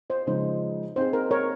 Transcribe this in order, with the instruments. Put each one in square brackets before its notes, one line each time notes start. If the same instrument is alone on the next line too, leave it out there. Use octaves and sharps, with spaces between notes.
[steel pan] C5 D#5
[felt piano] C#3 F3 G#3 D#4 [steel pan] C5
[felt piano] C4 D#4 G#4 [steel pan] C5
[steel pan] A#4
A#4 C#5